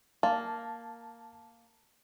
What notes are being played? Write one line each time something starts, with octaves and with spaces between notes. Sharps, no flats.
A#3 A5